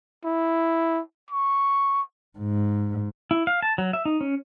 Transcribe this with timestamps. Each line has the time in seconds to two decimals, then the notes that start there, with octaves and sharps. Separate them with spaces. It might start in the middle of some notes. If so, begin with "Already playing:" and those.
0.25 E4
1.31 C#6
2.39 G#2
3.31 E4
3.47 F5
3.62 A5
3.78 F#3
3.93 E5
4.05 D#4
4.21 C#4